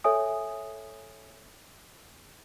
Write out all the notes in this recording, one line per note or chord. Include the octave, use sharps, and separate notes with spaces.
A4 C#5 E5 G#5 D#6